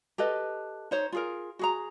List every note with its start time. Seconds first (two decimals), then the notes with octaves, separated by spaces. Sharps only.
0.18 G4 A4 B4 D#5
0.91 D#4 C5 C#5
1.12 F4 G#4 A#4
1.59 F#4 G#4 A#5